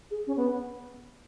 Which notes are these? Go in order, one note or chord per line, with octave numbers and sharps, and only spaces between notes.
G#4
C#4
B3